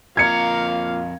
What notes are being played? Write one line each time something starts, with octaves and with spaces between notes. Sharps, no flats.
F2 A#3 F4 A#4 F5 G#6 C#7